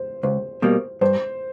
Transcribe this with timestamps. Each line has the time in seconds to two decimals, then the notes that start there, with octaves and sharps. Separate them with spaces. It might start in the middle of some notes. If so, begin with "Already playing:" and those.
Already playing: C5
0.23 C#2 C5
0.62 B2 G3 A#3
1.01 G2 C5